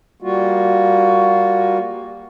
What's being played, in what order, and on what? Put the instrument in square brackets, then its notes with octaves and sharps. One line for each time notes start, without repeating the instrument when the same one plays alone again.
[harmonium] G3 A#3 F4 F#4